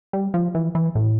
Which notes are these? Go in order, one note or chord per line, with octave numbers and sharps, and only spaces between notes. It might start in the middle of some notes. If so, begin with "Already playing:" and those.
G3
F3
E3
E3
A2